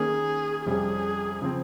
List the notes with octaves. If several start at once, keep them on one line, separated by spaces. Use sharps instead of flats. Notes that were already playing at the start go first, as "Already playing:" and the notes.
Already playing: D#3 A#3 C#4 G#4
F2 C3 G3 C#4 G#4
C#3 F3 C4